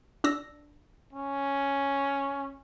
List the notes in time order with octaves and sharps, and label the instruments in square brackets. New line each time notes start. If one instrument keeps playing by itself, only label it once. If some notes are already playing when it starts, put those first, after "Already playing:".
[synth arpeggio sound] D4 E6 A#6
[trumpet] C#4